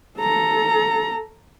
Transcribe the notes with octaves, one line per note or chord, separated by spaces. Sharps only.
A4 A#5